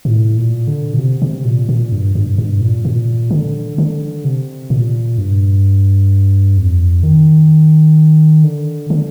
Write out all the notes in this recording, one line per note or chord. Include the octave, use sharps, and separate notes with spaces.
A2
A#2
D3
A#2
C3
C3
A#2
A#2
G2
G2
G2
A#2
A#2
D3
D3
C3
A#2
G2
F2
D#3
D3
D3